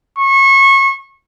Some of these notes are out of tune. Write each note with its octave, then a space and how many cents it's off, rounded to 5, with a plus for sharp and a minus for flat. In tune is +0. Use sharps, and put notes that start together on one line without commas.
C#6 -25